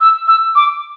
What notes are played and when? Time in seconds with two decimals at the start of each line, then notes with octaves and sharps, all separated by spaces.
0.01 E6
0.28 E6
0.56 D6